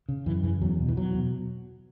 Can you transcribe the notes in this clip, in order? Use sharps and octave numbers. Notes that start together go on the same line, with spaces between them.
C#3
F#2 E3
C#3 E3
E2 F#3
B2
E3
E2 F#3
B2